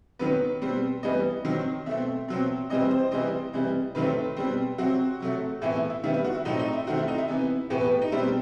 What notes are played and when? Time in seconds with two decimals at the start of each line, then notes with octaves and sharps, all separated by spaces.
0.19 D#3 F#3 B3 B4
0.61 B2 G3 C4
1.03 E3 G3 B3 D#5
1.45 D#3 F#3 C4
1.86 B2 A3 C4 E5
2.28 B2 F#3 C4
2.69 C3 E3 G3 C4 D#5
2.91 C5
3.11 C3 E3 G3 C4 D#5
3.53 C3 E3 G3
3.95 C3 D#3 F#3 A3 C4 B4
4.37 B2 G3 C4
4.78 C3 F#3 C4 F#4
5.20 C3 F#3 A3
5.62 A2 E3 B3 E4
5.75 E4
5.90 E4
6.04 D#3 G3 B3 E4
6.14 E4
6.24 F#4
6.35 E4
6.45 A2 F#3 A3 C4 D#4
6.59 D#4
6.73 E4
6.87 D#3 A3 C4 F#4
6.98 E4
7.08 D#4
7.18 E4
7.28 C3 E3 B3
7.70 A2 E3 B3 G4
7.81 B4
7.91 G4
8.01 D#4
8.12 B2 G3 C4 E4